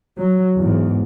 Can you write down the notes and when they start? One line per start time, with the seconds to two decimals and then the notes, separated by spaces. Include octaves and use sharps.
0.19 F#3
0.57 E2 G#2